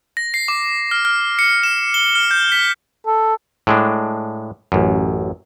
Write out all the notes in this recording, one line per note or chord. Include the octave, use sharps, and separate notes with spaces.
A#6
C7
D6
F6
F6
C#7
E7
G7
F6
G6
B6
A4
A2 G#3 D4
A1 F#2